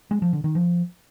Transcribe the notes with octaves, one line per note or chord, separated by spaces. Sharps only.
G#3
F3
D3
D#3
F3